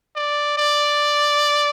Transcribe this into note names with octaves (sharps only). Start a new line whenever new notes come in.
D5
D5